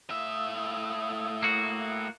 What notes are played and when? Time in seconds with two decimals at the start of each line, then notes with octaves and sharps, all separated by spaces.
0.10 A2 E5 F5 D#6 E6
1.43 A#3 F#4